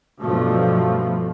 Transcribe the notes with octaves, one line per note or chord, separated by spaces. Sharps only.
B1 G2 B2 F3 A3